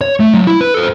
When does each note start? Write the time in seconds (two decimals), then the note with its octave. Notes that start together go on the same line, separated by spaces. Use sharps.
0.01 C#5
0.20 A3
0.34 F#3 F5
0.47 E4
0.61 B4
0.74 A4 C5